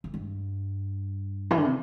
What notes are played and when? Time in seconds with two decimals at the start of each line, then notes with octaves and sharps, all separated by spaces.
0.04 F2
0.14 G2
1.51 E3
1.57 D3
1.65 C3